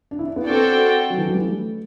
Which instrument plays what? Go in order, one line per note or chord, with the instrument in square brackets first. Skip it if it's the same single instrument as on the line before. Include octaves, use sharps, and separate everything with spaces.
[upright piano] D4
E4
D4
B3
[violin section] C4 F#4 A4 D5 G5
[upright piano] F#3
E3
F#3
G3
A3